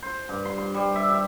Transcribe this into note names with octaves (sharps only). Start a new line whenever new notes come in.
C5
G2
C6
C6
G3
E5
E5